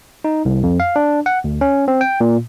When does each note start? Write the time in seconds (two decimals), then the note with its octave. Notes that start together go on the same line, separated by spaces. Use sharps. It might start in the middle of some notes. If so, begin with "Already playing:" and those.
0.24 D#4
0.45 C2
0.63 F2
0.80 F5
0.96 D4
1.26 F#5
1.44 D2
1.61 C#4
1.88 C4
2.01 G5
2.21 A#2